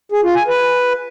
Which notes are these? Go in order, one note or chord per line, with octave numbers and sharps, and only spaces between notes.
G#4
F4
G#5
B4